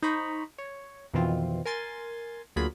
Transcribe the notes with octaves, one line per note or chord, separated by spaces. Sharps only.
D#4 C5 A#5 B5 C#6
C#5
F2 B2 D#3 E3 C4 F4
A#4 G#5 C6 A6
D2 F#3 A#3 F4 G#4 B5